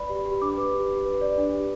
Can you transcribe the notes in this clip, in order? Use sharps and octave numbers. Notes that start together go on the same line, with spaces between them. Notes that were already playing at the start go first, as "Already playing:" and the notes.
Already playing: B4 D5 B5
G4
G4
D4 D6
B4
G4
G4
B4
D5
D4
G4